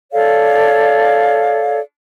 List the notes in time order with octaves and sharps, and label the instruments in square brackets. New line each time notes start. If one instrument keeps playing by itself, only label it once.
[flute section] A4 C#5 D5 F5